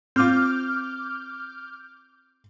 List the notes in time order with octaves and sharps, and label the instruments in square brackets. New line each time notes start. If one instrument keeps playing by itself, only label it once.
[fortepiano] C4 F4 [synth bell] D6 F6 G6